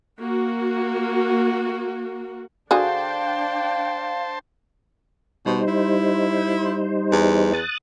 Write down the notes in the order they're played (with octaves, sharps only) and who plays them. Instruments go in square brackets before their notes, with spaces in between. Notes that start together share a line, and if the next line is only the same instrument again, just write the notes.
[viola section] A#3 F#4
[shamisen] D3 F#4 G#4 [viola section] D4 G5 [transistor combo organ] C5 A5 [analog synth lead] F5
[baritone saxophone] B2 [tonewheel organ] G3 D#4 C5
[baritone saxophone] E4
E2
[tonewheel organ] D#6 F#6 A6